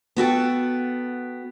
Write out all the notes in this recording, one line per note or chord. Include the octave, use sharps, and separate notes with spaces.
B3 F#4 A4 G5